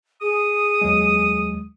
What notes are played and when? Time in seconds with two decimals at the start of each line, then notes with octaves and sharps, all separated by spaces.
0.21 G#4 D#6
0.81 D#2 F#3 G#3